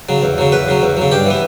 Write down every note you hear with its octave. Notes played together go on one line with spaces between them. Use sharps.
C#3 F#3
E2
C#3 F#3
E2 B4
C#3 F#3
E2
C#3 F#3
G2 G4
E3 B3